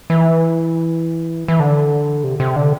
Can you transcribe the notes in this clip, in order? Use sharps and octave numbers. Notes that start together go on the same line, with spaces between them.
E3
E3
D3
C3
C3
D3